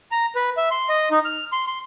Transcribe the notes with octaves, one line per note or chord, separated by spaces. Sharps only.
A#5
B4
E5
C6
D#5
D#4
F6
C6
C6